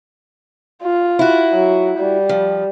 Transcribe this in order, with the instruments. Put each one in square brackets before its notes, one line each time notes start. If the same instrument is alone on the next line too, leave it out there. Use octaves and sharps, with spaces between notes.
[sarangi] F4
[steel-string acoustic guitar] E4 F#4
[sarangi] F#3
G3
[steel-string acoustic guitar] F3